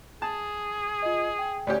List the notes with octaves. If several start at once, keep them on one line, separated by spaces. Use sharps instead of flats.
G#4 A5
F4 D#5
G5
D2 C#4 G4 D5